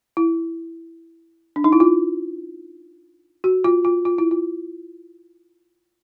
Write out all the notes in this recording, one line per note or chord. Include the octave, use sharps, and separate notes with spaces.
E4
D4
D#4
E4
F4
F#4
F4
F4
F4
E4
F4